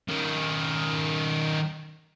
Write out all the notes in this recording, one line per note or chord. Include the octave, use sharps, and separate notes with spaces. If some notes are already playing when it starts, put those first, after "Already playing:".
D#3 C#4